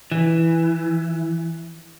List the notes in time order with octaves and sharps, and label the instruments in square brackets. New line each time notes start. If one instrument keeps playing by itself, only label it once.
[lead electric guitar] E3